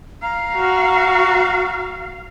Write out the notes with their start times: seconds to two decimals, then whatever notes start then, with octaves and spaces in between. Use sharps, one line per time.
0.23 F5 A#5
0.55 F#4